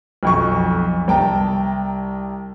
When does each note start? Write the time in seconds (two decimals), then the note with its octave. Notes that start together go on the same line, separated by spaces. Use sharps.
0.23 B1 F2 C#6
1.08 C2 G5 A5 A#5